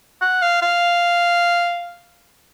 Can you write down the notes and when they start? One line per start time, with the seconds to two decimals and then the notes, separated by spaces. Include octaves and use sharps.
0.22 F#5
0.42 F5
0.62 F5